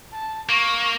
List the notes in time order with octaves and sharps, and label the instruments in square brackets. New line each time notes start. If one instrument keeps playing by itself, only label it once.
[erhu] A5
[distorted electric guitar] A#3 [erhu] C#6